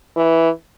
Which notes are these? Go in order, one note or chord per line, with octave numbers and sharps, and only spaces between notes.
E3